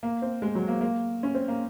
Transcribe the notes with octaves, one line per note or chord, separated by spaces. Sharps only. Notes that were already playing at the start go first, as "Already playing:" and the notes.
A#3
C4
G#3
F#3
A#3
A#3
C#4
C4
A#3